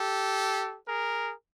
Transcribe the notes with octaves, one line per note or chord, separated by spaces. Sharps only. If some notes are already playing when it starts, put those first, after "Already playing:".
Already playing: G4 A4
G#4 A#4